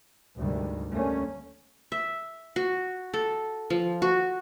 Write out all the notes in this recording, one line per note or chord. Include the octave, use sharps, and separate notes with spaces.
D2 G#2 C3 D#3 G3
D3 G3 A3 A#3 C#4
E5
F#4
A4
F3
F#4